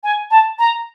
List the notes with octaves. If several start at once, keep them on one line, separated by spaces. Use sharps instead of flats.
G#5
A5
A#5